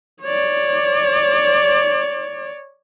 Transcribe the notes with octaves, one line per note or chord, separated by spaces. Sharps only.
C#5 D5